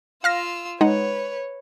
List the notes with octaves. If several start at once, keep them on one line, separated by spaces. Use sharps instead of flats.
F4 F5 E6 F6 A#6
G#3 D#4 B4 C#5 F#5